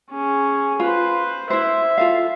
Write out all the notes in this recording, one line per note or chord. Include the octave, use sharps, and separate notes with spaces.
C#4 G#4
F4 B4 C5
E4 C5 E5
F4 A4 F5